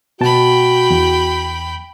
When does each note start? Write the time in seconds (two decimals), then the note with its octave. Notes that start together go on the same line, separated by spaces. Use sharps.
0.21 B2 F#4 G5 A5 B5
0.90 E2